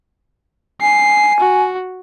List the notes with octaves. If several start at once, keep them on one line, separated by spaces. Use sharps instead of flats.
G#5 C7
F#4